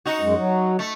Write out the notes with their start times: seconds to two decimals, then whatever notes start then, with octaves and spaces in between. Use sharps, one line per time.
0.05 D#4 F#4
0.21 F#2 G#3
0.36 F#3
0.79 A3